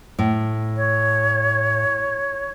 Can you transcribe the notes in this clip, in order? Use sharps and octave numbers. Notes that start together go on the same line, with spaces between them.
A2
C#5